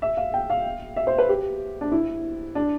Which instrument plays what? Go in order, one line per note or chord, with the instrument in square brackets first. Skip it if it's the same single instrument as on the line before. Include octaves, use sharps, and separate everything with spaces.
[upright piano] E5
F5
G5
F5
E5
C5
B4
G4
D4
E4
D4